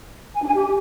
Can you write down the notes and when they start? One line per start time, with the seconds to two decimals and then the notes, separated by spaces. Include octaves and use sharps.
0.34 G#5
0.40 D4
0.47 G#5
0.53 G4